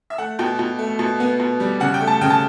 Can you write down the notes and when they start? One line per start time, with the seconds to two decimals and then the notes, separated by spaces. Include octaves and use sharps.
0.10 E5
0.18 A3 F#5
0.39 B2 G5
0.59 B2
0.79 A3
0.99 B2
1.20 B3
1.40 B2
1.60 G3
1.80 C#3 F#5
1.94 G5
2.01 A3
2.07 A5
2.21 C#3 G5
2.30 A5